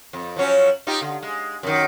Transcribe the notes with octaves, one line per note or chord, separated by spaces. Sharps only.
F2
F3 F#3 C#4
D#4 F4 G4
D3
G#3
F#2 D#3